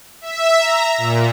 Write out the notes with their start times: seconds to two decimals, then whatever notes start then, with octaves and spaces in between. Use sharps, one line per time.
0.21 E5
0.59 A#5
0.98 A#2